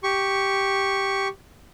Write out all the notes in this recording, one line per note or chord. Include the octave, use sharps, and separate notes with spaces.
G4 C#6